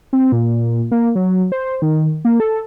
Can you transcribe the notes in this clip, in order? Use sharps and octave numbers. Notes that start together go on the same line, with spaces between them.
C4
A#2
A#3
F#3
C5
D#3
A#3
A4